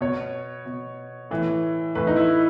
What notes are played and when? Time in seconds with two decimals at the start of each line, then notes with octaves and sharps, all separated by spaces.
0.01 B2 C#5
0.66 B2
1.31 A2 E3
1.95 A2 E3 B4
2.07 D#4
2.16 E4